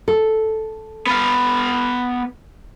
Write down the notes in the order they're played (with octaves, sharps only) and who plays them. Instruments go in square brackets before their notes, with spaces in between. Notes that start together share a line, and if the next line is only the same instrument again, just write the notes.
[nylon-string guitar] A4
[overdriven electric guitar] B3 F5